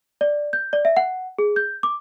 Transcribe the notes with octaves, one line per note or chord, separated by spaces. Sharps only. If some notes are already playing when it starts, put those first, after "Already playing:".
D5
G6
D5
E5
F#5
G#4
G6
D6